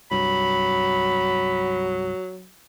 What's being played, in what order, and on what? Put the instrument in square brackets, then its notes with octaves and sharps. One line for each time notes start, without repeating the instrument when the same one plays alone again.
[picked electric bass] C2 G2 [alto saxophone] F#3 [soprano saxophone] B5